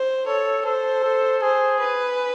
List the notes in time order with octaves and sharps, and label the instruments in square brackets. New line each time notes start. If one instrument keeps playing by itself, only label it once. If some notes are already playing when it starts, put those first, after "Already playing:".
Already playing: [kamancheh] C5
[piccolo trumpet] A4 [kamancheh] C#5
[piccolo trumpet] A4 [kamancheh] C5
[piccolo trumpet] A4
[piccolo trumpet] G#4 [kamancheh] C5
[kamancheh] B4